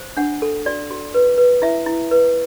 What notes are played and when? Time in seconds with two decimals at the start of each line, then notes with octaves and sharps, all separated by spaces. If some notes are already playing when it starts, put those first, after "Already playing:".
Already playing: C5
0.17 D4 F#5
0.42 A4
0.66 F#4 D5
0.90 F#4
1.14 B4
1.38 B4
1.62 E4 E5
1.86 E4
2.11 B4